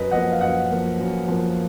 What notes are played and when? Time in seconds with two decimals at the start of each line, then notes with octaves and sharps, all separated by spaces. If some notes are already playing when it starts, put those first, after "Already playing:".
Already playing: F#2 B4 D#5
0.11 F3 A#3 D#5 F#5
0.32 F5
0.41 F#2 D#5 F#5
0.71 F3 A#3
0.99 F#2
1.28 F3 A#3